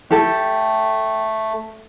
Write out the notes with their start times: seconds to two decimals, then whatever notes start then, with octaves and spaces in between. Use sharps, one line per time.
0.11 A3 G4 A4